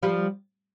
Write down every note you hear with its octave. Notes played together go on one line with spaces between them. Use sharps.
F3 G3